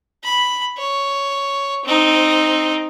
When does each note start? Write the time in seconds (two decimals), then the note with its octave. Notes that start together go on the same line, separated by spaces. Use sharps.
0.24 B5
0.77 C#5
1.85 C4 D#4